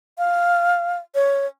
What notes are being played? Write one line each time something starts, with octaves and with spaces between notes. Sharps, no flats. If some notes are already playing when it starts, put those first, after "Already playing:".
F5
C#5